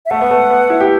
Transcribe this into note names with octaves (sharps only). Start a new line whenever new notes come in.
E5
A3 F#5
B3
A3
B3
E4
G4